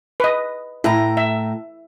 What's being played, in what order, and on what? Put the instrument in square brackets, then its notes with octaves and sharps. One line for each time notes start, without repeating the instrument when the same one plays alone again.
[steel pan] B4 D#5
[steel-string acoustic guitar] A2 A#5 [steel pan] E4
[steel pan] E5